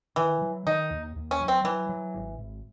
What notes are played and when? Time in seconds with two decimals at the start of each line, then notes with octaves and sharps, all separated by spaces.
0.16 D#3 E3
0.42 F#3
0.67 D#3 D#4
0.90 D#2
1.16 D#2
1.31 C#4
1.39 F#3
1.48 C4
1.64 E3 F#3
1.89 F#3
2.14 G#1
2.38 G#1